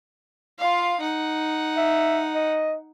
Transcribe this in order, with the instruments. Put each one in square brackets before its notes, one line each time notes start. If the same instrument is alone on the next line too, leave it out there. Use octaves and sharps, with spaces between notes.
[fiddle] F4 F5
D#4 F#5
[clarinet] E5
D#5